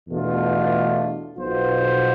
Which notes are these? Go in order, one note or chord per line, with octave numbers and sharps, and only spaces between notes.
E2 B2 A3 D4 F4
B1 B2 B3 F4 C5